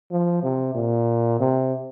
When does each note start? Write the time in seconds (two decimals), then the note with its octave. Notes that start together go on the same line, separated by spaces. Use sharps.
0.11 F3
0.43 C3
0.75 A#2
1.39 C3